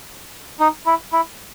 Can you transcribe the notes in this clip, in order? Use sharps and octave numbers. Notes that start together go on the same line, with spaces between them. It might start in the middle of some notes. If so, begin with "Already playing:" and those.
D#4
E4
E4